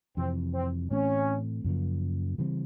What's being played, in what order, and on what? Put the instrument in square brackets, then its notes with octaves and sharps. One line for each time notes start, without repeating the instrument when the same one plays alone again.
[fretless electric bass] F2 C3 E3 [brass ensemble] C4
[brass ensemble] C4
[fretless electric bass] A2 E3 A3 C4 [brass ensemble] C#4
[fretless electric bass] F#2 C#3 F3 A#3
C#3 E3 G3 C4